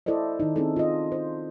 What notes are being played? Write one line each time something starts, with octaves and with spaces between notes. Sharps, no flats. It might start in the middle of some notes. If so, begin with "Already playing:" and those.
E4 A4 C5 D5 D#5
D#3 D#4
C4 C#4 D#4 E4 G#4 A4
F4 D#5
C5